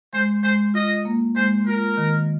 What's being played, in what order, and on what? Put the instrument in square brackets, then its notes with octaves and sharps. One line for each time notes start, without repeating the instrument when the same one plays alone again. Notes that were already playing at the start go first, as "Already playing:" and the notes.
[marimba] G#3 [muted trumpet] C5
[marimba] G#3 [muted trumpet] C5
[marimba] F4 [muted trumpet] D#5
[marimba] A#3
[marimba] G#3 [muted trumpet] C5
[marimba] F4 [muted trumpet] A#4
[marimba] D#3